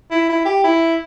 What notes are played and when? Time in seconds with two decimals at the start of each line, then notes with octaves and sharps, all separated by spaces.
0.11 E4
0.29 E4
0.46 G4
0.64 E4